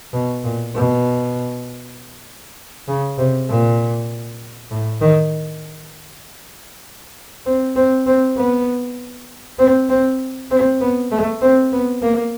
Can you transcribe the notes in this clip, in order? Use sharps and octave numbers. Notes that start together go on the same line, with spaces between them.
B2
A#2
B2
C#3
C3
A#2
A2
D#3
C4
C4
C4
B3
C4
C4
C4
B3
A3
C4
B3
A#3